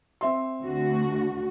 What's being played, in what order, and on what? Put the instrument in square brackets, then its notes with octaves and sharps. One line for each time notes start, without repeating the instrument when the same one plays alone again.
[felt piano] C4 E5 C6
[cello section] D2 D3 F#4